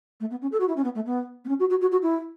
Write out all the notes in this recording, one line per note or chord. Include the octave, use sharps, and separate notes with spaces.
A3
B3
C#4
A4
F#4
E4
C#4
B3
A3
B3
B3
C#4
F#4
F#4
F#4
F#4
E4